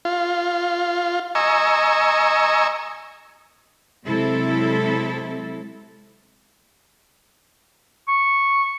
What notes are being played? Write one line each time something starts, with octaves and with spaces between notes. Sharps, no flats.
F4
D#5 G#5 A#5 C#6 E6
C3 F#3 G#3 C4 E4 A4
C#6